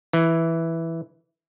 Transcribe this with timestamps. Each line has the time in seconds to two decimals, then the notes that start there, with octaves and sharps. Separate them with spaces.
0.13 E3